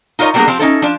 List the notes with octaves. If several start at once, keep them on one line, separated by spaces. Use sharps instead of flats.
D#4 F4 A#4 C#5 D#5
F#3 G3 A#3 B3 D4 G#4
F3 C4 G4
C#4 D#4 E4 A4
F3 D4